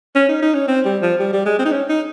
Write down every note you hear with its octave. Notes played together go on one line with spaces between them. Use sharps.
C#4
D#4
D#4
C#4
C4
G3
F3
G3
G3
G#3
C4
D#4
C#4
D#4